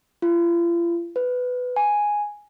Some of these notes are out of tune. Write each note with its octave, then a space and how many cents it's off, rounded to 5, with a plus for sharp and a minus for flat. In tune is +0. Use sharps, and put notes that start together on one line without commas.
F4 -40
B4 +15
G#5 +0